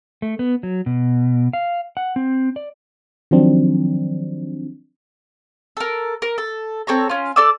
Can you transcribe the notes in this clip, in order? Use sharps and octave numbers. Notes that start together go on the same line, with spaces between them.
A3
B3
F#3
B2
F5
F#5
C4
D5
D#3 F3 F#3 C4 D4
A4 A#4
A#4
A4
C4 A4 C#5 A#5
C#4 F4
A4 D5 D6 E6